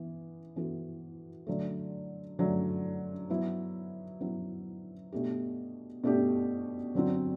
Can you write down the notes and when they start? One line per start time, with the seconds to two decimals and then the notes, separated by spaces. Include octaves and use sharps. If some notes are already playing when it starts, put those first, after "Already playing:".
Already playing: E3 B3
0.56 E3 B3 F#4 A4
1.47 D3 F#3 A3
2.39 D3 F#3 A3
3.30 F#3 B3 E4
4.20 F#3 B3 E4
5.12 B2 A3 D4 G4
6.04 B2 A3 D4 G4
6.95 D3 F#3 C4 F#4